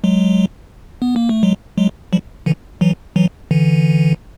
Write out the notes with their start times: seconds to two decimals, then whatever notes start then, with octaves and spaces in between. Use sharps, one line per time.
0.04 F#3 G#3
1.02 B3
1.16 A#3
1.29 A3
1.43 F#3 G#3
1.78 F#3 G#3
2.13 F3 G3
2.46 D3 E3
2.81 E3 F#3
3.16 E3 F#3
3.51 D3 E3